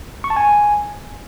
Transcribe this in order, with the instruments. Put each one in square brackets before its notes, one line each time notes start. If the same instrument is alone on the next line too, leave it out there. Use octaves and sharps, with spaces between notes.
[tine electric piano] C#6
A5
G#5